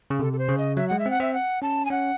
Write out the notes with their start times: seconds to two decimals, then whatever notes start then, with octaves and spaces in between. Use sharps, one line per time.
0.10 C#3
0.19 C3 A4
0.33 A4
0.39 C5
0.49 C#3
0.58 D#5
0.77 F#3 E5
0.88 G#3 F#5
0.99 E5
1.06 C4 F#5
1.20 C4 E5
1.34 F#5
1.62 C#4 A5
1.85 G#5
1.90 C#4 F#5